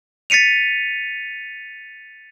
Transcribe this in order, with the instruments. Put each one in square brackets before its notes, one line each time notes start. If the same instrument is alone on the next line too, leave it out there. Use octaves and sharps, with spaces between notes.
[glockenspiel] A6 B6 C#7 D#7 F7